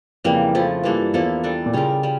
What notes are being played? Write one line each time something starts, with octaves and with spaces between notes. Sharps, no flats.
F2 C#3 E3 G3 A#3
F3 A3 E4
G2 E3 A#3 D4 A4
G2
E2 F3 A#3 E4 A4
G3 D4 A4
A#2
C#3 G3 C#4 F4 A#4
G3 C#4